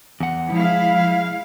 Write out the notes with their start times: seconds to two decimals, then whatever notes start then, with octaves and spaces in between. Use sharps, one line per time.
0.20 E2 F#5
0.52 F3 G#3 E4 F5